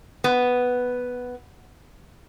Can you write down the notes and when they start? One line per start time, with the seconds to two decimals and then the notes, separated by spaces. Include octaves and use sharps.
0.24 B3